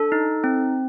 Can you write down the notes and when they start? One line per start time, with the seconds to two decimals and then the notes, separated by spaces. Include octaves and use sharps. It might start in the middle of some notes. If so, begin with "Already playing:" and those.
Already playing: D4 A4
0.12 D#4
0.44 C4